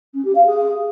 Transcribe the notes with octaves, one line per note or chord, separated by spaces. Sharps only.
C#4
G4
F5
G#4